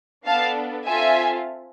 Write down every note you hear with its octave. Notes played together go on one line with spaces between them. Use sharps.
B3 D4 A4 F5 A5
C4 F4 A4 E5 G#5